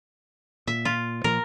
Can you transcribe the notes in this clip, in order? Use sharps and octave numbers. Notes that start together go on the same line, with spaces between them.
A#2 E5
F4
A#2 F3 A#4